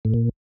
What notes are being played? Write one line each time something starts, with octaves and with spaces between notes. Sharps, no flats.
A2
A#2